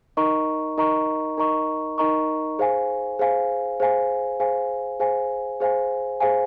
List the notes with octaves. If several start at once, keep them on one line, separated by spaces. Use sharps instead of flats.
D#4 A#4 D#5 A#5 C#6
D#4 A#4 D#5 A#5 C#6
D#4 A#4 D#5 A#5 C#6
D#4 A#4 D#5 A#5 C#6
G#4 C5 F5 G#5
G#4 C5 F5 G#5
G#4 C5 F5 G#5
G#4 C5 F5 G#5
G#4 C5 F5 G#5
G#4 C5 F5 G#5
G#4 C5 F5 G#5